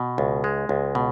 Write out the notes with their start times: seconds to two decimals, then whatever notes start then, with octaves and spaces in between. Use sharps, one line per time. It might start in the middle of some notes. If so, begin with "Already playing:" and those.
Already playing: B2
0.18 C#2
0.44 G#3
0.69 C#2
0.95 B2